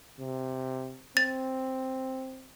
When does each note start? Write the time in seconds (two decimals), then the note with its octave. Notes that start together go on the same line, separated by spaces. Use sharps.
0.20 C3
1.17 C4 A6